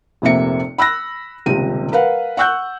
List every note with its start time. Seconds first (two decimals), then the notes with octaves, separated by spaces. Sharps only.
0.22 F1 A#1 C3 A#3 E5 C#7
0.78 B5 E6 F#6 A#6
1.46 D#1 C#2 C3 G4 D#7
1.92 A#4 B4 F5 F#5
2.37 F#5 C#6 E6 F#6 G6